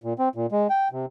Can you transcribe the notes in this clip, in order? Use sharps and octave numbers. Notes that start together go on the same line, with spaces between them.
A#2
C4
A#2
G#3
G5
C3